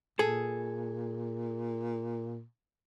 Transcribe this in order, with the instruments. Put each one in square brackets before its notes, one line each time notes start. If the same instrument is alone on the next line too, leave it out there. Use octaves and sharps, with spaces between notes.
[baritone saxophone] A#2 [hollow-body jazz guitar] G#4 A4